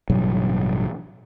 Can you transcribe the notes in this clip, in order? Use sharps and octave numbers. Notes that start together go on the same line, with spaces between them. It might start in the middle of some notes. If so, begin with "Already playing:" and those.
A1 G2 B2 F#3